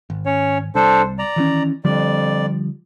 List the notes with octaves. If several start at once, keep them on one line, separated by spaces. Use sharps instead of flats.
G#1
C#4 C#5
C2 D4 A4 C5
D5 A#5
D#3 E3 C#4
F2 D3 F3 G3 D5